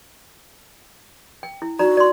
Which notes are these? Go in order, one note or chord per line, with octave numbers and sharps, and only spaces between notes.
G5
E4
D#4 F#4 D5 A#5
D5 C6